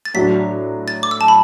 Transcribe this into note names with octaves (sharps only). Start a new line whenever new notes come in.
A6
A2 F#3 D4 F#4 B6
A6
D6
E6
A5
B5